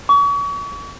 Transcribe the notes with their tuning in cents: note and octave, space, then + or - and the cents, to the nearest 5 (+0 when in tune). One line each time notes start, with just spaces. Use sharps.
C#6 +40